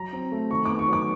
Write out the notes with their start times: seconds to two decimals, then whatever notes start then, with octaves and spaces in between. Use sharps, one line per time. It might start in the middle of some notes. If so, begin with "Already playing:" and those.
Already playing: F#3 A#5
0.13 C4
0.32 A3
0.51 D#3 C#6
0.65 B3 D6
0.79 C#6
0.88 F#3 D6